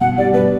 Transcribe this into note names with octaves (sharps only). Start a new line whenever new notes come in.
B2 F#5
G3 D5
B2 B4